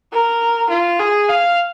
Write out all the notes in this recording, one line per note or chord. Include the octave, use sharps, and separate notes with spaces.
A#4
F4
G#4
F5